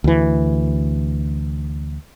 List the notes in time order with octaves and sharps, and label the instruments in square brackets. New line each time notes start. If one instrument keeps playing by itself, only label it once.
[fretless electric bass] D2 E3